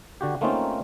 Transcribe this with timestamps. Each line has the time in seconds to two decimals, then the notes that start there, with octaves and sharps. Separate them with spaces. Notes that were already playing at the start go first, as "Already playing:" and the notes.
0.21 D3 F#4 G4
0.41 A3 A#3 C4 C#4 D#4 F4